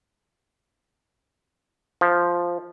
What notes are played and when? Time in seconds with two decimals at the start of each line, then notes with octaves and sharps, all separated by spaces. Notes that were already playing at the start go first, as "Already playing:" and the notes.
2.01 F3